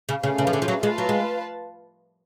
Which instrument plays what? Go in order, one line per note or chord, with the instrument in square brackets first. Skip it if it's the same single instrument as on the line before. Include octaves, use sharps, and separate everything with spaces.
[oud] C#3
[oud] C#3 [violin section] A3 C#4 G#4 B4 F5
[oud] C#3
F3
D3
F3
F#3
[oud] G#3 [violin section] F4 B4 F5 A5
[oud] F#3
G#3